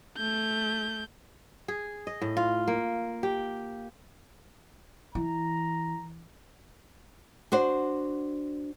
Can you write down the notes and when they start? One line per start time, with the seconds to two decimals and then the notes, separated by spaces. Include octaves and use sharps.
0.17 A3 G6
1.68 G#4
2.07 D#5
2.21 A2
2.37 F4
2.68 A#3
3.23 G4
5.15 E3 A#5
7.52 D4 F#4 C5